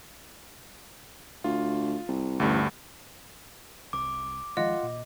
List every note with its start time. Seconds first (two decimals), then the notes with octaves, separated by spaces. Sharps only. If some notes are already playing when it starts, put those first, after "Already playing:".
1.44 D2 F4
2.08 C2
2.40 A1 D2 G2
3.93 C2 D6
4.57 D#3 F3 G#3 F4 D#5 F#5
4.83 A#2